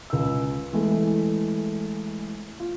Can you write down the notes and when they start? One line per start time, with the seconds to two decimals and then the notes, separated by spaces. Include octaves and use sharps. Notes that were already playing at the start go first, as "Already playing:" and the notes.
0.10 C#2 E6
0.73 E3 G#3 A3
2.59 F4